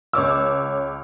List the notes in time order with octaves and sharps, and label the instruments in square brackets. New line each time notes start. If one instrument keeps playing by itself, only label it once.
[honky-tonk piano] C#2 C#5 D6 E6